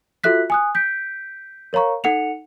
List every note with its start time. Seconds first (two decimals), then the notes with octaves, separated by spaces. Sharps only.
0.24 F4 F#4 A4 E5 F#6 B6
0.50 G#5 D#6 F#6
0.75 G6 B6 D7
1.73 A#4 C#5 F5 A#5 C#6
2.04 D#4 A4 F#5 C#7 F7